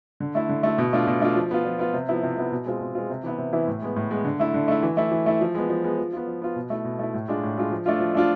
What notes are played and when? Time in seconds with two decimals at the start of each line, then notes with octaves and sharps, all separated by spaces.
0.20 D3
0.35 A3 E4
0.49 D3
0.63 A3 E4
0.78 B2
0.93 A3 D4 F4
1.07 B2
1.21 A3 D4 F4
1.36 F3
1.51 B3 F4
1.65 F3
1.79 B3 F4
1.94 C3
2.09 F3 B3 E4
2.23 C3
2.37 F3 B3 E4
2.51 B2
2.66 G#3 C4 F4
2.80 B2
2.95 G#3 C4 F4
3.10 C3
3.23 E3 B3 E4
3.38 C3
3.53 E3 B3 E4
3.68 A2
3.82 G#3 B3
3.96 A2
4.10 G#3 B3
4.25 D3
4.40 A3 E4
4.54 D3
4.68 A3 E4
4.83 E3
4.97 A3 E4
5.12 E3
5.26 A3 E4
5.41 F3
5.55 G#3 B3
5.69 F3
5.84 G#3 B3
5.98 F3
6.13 B3 F4
6.27 F3
6.42 B3 F4
6.56 B2
6.70 A3 E4
6.85 B2
6.99 A3 E4
7.14 A2
7.28 G#3 D4 F4
7.43 A2
7.57 G#3 D4 F4
7.71 F3
7.86 A3 D4 F4
8.00 F3
8.15 A3 D4 F4